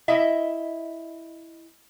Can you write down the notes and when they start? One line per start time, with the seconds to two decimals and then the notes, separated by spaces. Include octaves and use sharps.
0.08 E4 D#5 E5